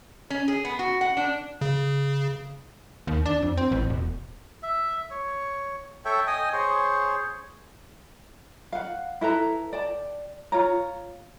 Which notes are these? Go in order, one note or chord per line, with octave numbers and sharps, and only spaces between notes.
C#4
G#4
B3
F#4
F#5
D4
C#3
D#2
D4
F2
C4
A1
E1
E5
C#5
A4 C#5 E5 G5
D#5 G5 G#5 D#6
G#4 C5 C#5
F5 F#5
E4 A4 B4 A#5
D5 G5 A5
F4 C#5 A#5